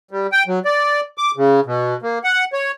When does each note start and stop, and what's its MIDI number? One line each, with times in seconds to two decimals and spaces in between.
0.11 0.27 55
0.32 0.43 79
0.47 0.59 54
0.65 1.01 74
1.18 1.31 86
1.37 1.60 49
1.66 1.97 47
2.02 2.19 58
2.24 2.45 78
2.53 2.71 73